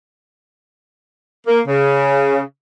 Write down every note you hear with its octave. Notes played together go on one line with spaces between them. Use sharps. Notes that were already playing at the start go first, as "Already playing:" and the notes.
A#3
C#3